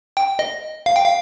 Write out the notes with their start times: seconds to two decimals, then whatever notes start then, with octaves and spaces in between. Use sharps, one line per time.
0.17 G5
0.39 D#5
0.86 F5
0.96 G5
1.04 F5